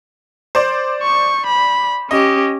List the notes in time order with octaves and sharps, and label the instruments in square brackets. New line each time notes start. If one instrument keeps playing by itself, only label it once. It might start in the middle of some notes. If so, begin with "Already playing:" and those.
[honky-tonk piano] C5 D5
[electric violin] C#6
B5
[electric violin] C#4 G4 [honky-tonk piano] D#5